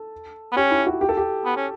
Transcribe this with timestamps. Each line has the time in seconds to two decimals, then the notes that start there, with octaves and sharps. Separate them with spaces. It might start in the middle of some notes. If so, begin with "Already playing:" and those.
Already playing: A4
0.52 B3
0.56 C#4 G4
0.71 E4
0.87 F#4
1.01 G4
1.09 A4
1.17 G4
1.45 B3
1.57 C#4